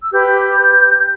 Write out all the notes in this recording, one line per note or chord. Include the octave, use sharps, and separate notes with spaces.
E6
G4 B4 G6